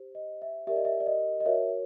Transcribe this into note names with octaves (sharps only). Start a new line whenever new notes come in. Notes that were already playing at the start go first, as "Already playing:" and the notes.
Already playing: G4 C5
D#5
E5
G4 A#4 D5 E5
D#5
E5
D5
D#5
D#5
F#4 A#4 C#5 E5